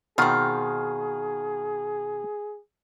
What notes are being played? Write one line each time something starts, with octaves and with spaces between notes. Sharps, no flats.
B2 D#3 C4 F4 G#4